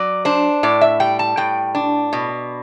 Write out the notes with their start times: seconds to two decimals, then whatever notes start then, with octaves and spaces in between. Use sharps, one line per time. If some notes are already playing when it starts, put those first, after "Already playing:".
Already playing: F#3 D5
0.25 D4 C5
0.63 A2 D5
0.81 E5
1.00 G3 G5
1.19 A5
1.37 A2 G5
1.75 D4
2.13 B2